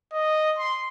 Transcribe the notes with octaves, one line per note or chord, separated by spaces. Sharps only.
D#5
C6